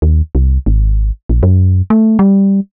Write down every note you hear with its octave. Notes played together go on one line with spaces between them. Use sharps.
D#2
C2
G#1
A#1
F#2
A3
G3